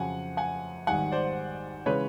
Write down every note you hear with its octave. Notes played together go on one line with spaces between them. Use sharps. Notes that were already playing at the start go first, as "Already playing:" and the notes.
Already playing: F2 C#3 F#3 F#5 G#5
F#5 G#5
G#1 G#2 D#3 G3 F#5 G#5
C5 D5
C#3 E3 G#3 B4 C#5